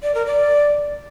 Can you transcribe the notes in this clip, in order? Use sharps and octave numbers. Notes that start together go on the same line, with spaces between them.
D5
A#4
D5